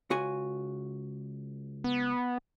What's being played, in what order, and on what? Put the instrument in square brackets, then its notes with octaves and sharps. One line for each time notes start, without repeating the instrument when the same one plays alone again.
[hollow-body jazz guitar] C#2 F#4 G#5
[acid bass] B3